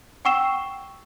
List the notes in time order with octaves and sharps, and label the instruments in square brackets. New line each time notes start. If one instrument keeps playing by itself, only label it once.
[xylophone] F#5 G5 C#6 E6 C7 E7